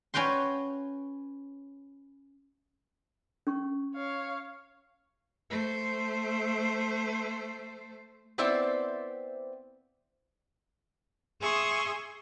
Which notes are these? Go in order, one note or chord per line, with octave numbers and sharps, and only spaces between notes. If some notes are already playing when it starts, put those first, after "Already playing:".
C#4 F#4 B4 G5 C6
C#4 C#6
C#5 F5
A3 C5
B3 C4 E4 C5 D5 E5
G#4 E5 G#5 C6 C#6 D#6